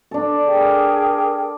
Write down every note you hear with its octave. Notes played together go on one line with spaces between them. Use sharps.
D4 A4
G#4 A#4 G5